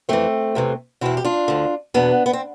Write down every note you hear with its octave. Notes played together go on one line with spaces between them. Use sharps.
F2 E3 A3 C4
E2 C3 E3
E2 B2 C4 E4
G4
D4 F4
D2 D3
E2 B2 B3 D4
B3
C4